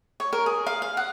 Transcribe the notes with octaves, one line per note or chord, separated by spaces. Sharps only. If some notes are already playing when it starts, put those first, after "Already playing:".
C#5
A#4
G#4
F5
F5
F#5